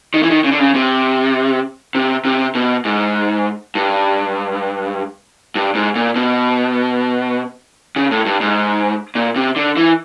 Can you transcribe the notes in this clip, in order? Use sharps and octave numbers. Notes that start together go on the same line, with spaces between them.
D#3
E3
D#3
C#3
D3
C#3
C3
C3
C3
B2
G#2
G2
G2
G#2
A#2
B2
C#3
A2
G2
G#2
A#2
C3
D3
E3